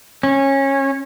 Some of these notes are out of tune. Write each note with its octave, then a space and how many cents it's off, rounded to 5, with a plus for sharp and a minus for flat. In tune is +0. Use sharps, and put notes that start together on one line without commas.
C#4 -20